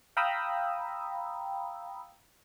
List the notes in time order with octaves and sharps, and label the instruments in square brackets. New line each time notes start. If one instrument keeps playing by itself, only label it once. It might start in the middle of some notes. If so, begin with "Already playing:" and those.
[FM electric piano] F5 G5 A#5 B5 D#6 E6